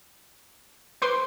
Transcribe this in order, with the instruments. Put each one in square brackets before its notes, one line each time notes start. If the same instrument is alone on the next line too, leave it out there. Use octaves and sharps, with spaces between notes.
[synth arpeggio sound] B4 C6 D6 [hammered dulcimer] C5